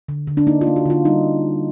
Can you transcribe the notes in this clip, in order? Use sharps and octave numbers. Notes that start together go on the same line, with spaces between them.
D3
D3
D4
A#3 D#4
F4
A#3
F#4
D3 F4
G3 D#4